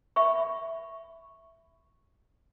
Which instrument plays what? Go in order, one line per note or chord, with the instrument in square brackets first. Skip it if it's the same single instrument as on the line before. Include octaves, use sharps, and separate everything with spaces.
[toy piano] E5 B5 C#6